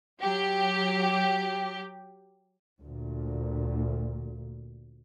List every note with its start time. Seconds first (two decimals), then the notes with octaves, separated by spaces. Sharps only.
0.22 F#3 G4
2.80 D2 A#2